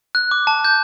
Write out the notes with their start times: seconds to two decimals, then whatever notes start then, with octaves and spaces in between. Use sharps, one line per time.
0.15 F#6
0.31 D6
0.47 A5
0.64 G6